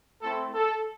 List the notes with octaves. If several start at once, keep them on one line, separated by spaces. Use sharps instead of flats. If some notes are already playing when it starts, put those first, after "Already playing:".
A3 C4 E4 A4
A4